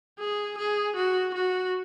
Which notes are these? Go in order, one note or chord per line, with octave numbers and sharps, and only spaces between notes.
G#4
G#4
F#4
F#4